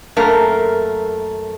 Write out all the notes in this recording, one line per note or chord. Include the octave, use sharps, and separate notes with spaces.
F#2 A3 A#3 A#4